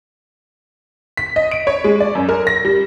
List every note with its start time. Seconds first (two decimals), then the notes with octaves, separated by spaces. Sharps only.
1.17 B6
1.36 D#5
1.51 D7
1.67 C#5
1.84 G#3
2.00 D5
2.15 F#2
2.29 A#4
2.47 A#6
2.65 G3